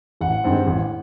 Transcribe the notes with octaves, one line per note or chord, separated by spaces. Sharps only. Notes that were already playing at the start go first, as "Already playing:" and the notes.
A1 F#5
G2 D#3 G#3 C4
A1